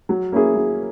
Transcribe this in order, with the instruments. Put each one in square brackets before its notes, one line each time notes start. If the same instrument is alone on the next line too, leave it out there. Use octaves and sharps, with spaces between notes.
[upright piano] F#3
A#3 C#4 E4 G#4
F#3